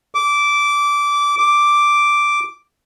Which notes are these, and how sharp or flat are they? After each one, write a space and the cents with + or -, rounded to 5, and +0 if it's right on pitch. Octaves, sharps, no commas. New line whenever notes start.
D6 -15
D6 +0